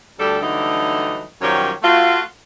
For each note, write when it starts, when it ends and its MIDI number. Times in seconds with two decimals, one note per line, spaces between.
0.19 0.38 38
0.19 0.38 55
0.19 0.38 69
0.41 1.24 50
0.41 1.24 52
0.41 1.24 54
0.41 1.24 55
0.41 1.24 57
0.41 1.24 63
1.41 1.71 42
1.41 1.71 51
1.41 1.71 53
1.41 1.71 55
1.41 1.71 73
1.83 2.21 57
1.83 2.21 65
1.83 2.21 66